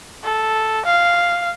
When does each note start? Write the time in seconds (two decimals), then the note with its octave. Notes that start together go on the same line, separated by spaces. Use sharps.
0.24 A4
0.86 F5